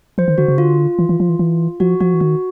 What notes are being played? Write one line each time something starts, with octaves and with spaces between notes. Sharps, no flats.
F3 C5
D#3
D3 F#4
C#3
D3 F4
E3
E3
F3
E3
E3
F3 F#4
F3 F#4
E3
D#3 F#4